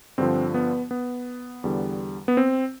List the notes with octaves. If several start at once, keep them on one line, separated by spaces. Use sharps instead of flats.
G2 D3 F3 C4
B3
B3
E2 D3 G3
B3
C4